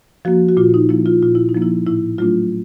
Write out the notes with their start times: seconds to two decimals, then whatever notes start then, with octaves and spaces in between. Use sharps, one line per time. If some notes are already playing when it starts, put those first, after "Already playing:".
0.25 F3 A#3 F#4
0.49 F#4
0.57 A#2 F4
0.74 D#4
0.89 F3 A#3 E4
1.06 F4
1.22 A#2 F4
1.35 E4
1.49 D#4
1.55 F3 A#3
1.62 E4
1.86 A2 E4
2.18 F#3 A3 D4 F4